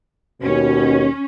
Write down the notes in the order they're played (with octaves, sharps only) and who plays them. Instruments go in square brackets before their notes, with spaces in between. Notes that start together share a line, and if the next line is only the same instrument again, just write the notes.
[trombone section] D#2 B2 [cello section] C#4